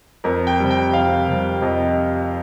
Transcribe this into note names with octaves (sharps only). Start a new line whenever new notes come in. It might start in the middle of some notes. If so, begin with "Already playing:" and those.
F2 A#4
G5
C3 G3
G5
F2 F5
C3 G3
F2 D#5